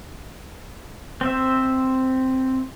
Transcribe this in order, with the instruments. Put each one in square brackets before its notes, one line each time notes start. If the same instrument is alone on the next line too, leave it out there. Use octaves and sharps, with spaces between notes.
[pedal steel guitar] C4 C5 E5